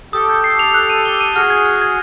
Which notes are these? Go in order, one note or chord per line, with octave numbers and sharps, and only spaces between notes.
G4 A4 D#6
G6
C7
F7
F#6
D#7
G7
D#7
F#4 G#4 F6
G#6
F6
G#6